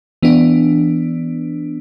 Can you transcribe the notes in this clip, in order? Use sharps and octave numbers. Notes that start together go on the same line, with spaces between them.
E3 B3 D4